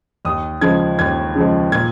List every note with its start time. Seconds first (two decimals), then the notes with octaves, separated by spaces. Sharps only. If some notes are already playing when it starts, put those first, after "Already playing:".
0.25 D#2 D#6
0.61 C#3 F3 G#3 G#6
0.99 D#2 G#6
1.36 C#3 F3 G#3
1.72 A#2 G#6